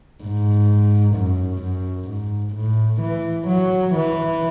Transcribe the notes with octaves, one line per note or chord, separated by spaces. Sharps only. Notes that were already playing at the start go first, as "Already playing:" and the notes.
G#2
F#2
F#2
G#2
A2
E3
F#3
E3